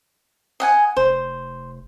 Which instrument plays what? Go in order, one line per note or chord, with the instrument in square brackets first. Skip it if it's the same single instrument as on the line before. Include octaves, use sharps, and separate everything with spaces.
[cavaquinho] D#5 F#5 G#5
[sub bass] F1 [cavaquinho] C5